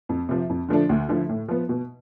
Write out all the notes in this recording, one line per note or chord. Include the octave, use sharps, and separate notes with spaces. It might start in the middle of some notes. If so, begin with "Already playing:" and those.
F2
C3 F3
F2
D3 F3 A3 D4
D2
D3 F3 A3 E4
A2
F3 B3
B2